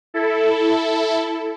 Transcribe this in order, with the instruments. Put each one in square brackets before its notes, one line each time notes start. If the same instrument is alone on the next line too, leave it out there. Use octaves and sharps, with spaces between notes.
[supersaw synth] E4 A4